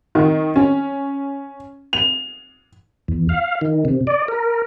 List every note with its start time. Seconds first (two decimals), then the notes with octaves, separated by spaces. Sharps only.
0.15 D#3
0.56 C#4
1.93 F7
3.08 E2
3.29 F5
3.61 D#3
3.85 C3
4.07 D5
4.28 A#4